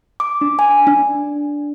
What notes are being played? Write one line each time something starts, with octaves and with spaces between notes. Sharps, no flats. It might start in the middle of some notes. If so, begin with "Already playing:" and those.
D6
D4
G#5
D4